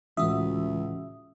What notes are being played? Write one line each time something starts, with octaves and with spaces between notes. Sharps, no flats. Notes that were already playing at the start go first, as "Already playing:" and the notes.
C#2 A2 E3 F#4 E5 D#6